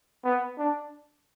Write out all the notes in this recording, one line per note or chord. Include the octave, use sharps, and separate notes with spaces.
B3
D4